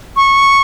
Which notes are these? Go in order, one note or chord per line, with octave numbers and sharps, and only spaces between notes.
C#6